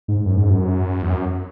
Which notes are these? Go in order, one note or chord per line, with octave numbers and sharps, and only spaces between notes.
G#2
F#2
G#2
F#2
E2
F#2